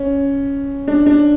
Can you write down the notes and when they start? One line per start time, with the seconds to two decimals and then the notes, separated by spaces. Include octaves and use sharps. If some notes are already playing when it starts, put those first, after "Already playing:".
Already playing: C#4
0.88 D4
1.06 D4